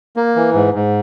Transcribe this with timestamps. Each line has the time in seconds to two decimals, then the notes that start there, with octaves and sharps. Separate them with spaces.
0.16 A#3
0.36 E3
0.54 G#2
0.74 G#2